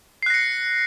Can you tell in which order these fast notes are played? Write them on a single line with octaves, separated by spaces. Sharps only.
C7 F#6 A#6 C#7